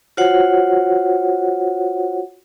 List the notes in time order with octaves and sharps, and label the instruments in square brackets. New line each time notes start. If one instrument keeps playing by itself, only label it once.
[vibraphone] F4 F#4 C5 C#5 F#5